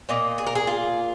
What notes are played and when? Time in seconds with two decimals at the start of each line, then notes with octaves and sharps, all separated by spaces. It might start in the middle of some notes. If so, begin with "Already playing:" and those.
0.09 A#2 A#3 D#5
0.38 G#4
0.47 A#4
0.55 G#4
0.67 F4